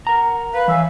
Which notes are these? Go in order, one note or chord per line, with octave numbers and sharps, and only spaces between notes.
A#4 F#5 A#5
B4 F5
E3 C#5 E5 G#5